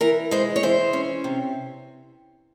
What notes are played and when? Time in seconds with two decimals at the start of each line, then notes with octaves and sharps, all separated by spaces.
0.01 E3 A#4
0.31 G#3 C5
0.56 C#5
0.63 E3 C5
0.93 C#4
1.24 C3